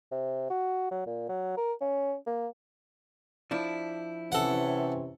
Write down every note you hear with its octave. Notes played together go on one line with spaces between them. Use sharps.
C3
F#4
F#3
A#2
F#3
A#4
C#4
A#3
F3 D4 E4
C3 E3 C#4 A4 F#5